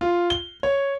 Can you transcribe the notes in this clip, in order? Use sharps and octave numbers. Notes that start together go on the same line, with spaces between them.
F4
G7
C#5